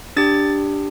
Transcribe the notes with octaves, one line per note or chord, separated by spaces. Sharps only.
D4 G4 A6